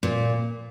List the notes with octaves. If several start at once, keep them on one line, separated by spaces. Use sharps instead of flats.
A#2